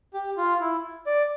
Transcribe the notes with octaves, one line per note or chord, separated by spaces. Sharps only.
G4
F4
E4
D5